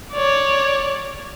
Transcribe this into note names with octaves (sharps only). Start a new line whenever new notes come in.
C#5 D5